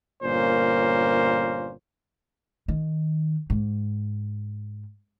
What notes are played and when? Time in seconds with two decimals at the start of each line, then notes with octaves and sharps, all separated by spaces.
0.23 G1 A#2 A#3 C#4 C5
2.68 D#3
3.50 G#2